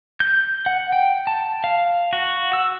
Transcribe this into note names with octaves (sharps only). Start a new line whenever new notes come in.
G6
F#5
G5
A5
F5
F#4
E6